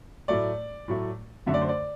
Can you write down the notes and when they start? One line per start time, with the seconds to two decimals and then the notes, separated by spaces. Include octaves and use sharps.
0.28 A2 F#3 A3 D5
0.88 A2 F#3 A3
1.46 F#2 D3 A3 E5
1.54 D5
1.61 C5
1.69 D5